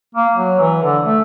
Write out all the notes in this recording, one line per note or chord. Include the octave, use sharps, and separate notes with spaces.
A#3
F#3
E3
D3
A3